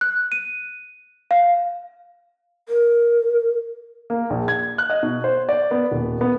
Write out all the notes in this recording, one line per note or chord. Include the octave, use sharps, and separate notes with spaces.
F#6
D#7
F5
A#4
A#3
A#1
G#6
F#6
D#5
B2
C5
D5
B3
D#1
B3